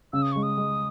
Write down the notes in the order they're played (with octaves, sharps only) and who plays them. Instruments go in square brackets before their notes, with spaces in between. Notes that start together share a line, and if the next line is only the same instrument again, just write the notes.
[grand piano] C#3 [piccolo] E6
[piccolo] D#6
[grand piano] G#3 [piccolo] C#6
[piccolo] D#6
[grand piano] G#3